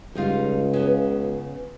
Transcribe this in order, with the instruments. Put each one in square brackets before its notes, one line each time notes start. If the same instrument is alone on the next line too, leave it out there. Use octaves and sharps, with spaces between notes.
[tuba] C#2 [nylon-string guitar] G3 D#4 F4
[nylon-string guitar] C#3 B3